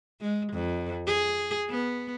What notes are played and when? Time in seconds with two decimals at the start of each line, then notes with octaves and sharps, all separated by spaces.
0.21 G#3
0.53 F2
1.07 G#4
1.69 B3